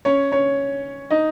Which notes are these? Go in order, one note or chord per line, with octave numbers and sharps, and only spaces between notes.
C#4 C#5
C#4 C#5
D#4 D#5